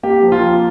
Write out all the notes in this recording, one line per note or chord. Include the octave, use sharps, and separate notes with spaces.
A#3 G4
F3
F4
A#3